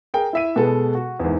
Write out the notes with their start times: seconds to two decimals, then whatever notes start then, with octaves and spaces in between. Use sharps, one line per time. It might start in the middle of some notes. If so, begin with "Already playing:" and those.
0.14 G#4 A#4 G5
0.33 E4 E5 D#7
0.56 B2 G#3 B3 A4
0.95 F#4
1.20 G#1 E2